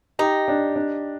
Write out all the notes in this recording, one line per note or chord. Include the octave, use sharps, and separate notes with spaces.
D#4 G4
D4
D4